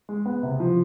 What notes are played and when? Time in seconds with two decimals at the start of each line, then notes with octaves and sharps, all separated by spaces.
0.09 G#3
0.26 B3
0.43 C3
0.60 F3